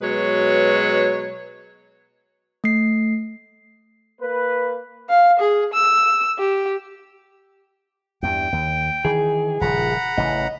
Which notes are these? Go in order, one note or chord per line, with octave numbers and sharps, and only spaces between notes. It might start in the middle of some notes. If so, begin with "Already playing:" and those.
B2 F#3 G#3 B4 C#5
A3 C7
A#3 B4
F5
G#4
E6
G4
E2 G2 G5
D#2
D#3 E3 G#4
D#1 C#3 F3 F#5 A#5 B5
A1 C#3 E3 D#5